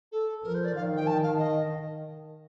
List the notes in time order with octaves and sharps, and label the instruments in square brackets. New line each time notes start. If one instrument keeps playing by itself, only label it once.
[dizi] A4
[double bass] F3 [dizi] A#4
[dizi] C5
D5
[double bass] D#3 [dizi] F5
[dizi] G5
A5
F5
D#5